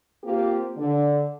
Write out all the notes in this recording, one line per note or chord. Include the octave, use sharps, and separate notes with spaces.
A#3 C4 F4 G4
D3